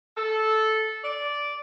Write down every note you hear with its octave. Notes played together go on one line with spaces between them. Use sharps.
A4
D5